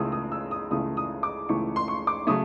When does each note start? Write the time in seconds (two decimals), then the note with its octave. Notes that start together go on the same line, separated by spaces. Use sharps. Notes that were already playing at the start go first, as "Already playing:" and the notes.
Already playing: C#2 C#3 E3 A3 D#6 E6
0.12 D#6
0.32 E6
0.51 D#6
0.71 C#2 C#3 E3 A3 D#6
0.97 D#6
1.23 D6
1.49 C#2 C#3 E3 A3 C#6
1.76 C6
1.88 C#6
2.07 D6
2.27 C#3 F#3 A3 D#6